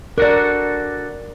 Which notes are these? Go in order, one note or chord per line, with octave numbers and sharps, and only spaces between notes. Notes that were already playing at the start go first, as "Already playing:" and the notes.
D4 F#4 A4 A#4 D5